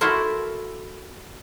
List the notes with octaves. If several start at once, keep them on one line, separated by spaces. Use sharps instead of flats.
E4 F#4 A4 A#4 C5